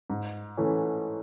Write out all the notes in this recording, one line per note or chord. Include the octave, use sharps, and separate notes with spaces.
G#2
E3 A3 C#4